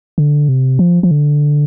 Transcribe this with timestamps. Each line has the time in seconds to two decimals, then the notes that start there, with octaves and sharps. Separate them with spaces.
0.18 D3
0.49 C3
0.79 F3
1.03 F3
1.11 D3